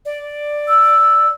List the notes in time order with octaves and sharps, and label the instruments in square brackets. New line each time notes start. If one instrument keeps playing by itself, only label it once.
[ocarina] D5
[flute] E6